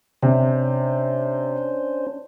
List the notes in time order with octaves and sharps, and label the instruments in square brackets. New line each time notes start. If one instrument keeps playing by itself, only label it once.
[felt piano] C3 [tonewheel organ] C#4 D4 C5